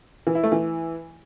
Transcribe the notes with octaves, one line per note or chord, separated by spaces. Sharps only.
E3
E4
A3
E3